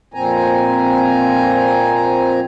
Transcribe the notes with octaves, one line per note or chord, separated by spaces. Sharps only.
F2 A#2 C4 G#5 A#5